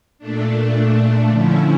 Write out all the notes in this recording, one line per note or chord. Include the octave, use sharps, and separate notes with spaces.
A#2 A3 D4
D3 F3 C#4 E4